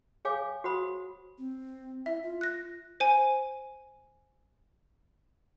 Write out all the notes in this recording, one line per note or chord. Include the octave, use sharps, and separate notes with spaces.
G#4 C#5 F5 G#5 D6
F#4 C5 F#5 B5 D#6
C4
E4 E5
F4
F#6 A#6
C5 G#5